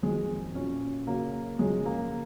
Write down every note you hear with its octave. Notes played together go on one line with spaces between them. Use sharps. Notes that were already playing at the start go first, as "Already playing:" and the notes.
F2 D#3 F#3 G#3
A#2 F#3 C#4
F#2 C#3 F#3 A#3
F#2 C#3 F3 G#3
A#3